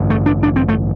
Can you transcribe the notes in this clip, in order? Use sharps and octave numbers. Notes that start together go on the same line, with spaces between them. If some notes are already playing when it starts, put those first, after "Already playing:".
Already playing: A1 G2 D3
A3
D4
D4
C4
A3